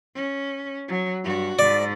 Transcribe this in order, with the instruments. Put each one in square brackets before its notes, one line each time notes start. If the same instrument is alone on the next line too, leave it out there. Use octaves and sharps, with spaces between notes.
[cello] C#4
F#3
G2 F#4
[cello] G#2 [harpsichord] D5